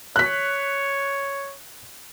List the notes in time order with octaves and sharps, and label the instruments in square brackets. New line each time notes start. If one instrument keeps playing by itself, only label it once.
[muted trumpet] C#5 [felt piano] F#6 B6